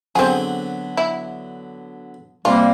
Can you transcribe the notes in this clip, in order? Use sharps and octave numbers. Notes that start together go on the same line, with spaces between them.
D3 F#3 B3 C4 G#4
E4
C3 G3 A#3 F4